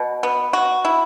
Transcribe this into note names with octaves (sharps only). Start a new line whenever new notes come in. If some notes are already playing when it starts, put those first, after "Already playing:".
Already playing: B2
B3
F#4
E4